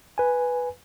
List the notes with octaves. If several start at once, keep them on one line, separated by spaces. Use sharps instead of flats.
B4 G#5